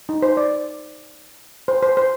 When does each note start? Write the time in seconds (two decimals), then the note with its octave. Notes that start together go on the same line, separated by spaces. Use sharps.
0.09 D#4
0.22 C5
0.37 D5
1.68 C5
1.83 C5
1.97 C5